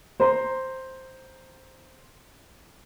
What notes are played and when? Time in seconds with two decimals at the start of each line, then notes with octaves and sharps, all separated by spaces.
0.20 C5 A#5 C6